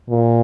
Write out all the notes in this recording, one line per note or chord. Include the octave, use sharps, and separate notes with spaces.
A#2